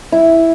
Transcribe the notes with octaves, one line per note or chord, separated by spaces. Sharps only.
E4